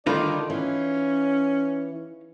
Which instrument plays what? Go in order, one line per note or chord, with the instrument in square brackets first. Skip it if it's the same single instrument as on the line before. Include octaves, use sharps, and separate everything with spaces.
[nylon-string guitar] D3 D#3 G3 [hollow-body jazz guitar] D#4 F4 B4 [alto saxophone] D5
[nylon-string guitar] E3 [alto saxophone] C#4